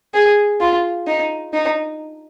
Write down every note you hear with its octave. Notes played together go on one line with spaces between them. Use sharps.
G#4
F4
D#4
D#4